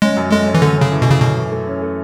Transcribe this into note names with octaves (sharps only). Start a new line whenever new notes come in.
G#3 C#4
F#2
G#3 A3
C#4
E3
D3 A3
C#3 C#4
E3
B2
C#3 A3
F#2 B2
E3
A3
C#4
A3